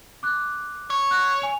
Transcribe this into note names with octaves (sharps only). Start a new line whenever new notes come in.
D6 F#6
C#5
F#6
G#5 F7